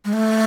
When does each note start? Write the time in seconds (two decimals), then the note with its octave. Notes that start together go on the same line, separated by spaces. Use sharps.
0.05 G#3
0.13 A3